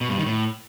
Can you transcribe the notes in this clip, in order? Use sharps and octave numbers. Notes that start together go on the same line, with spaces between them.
B2
G2
D#3
A2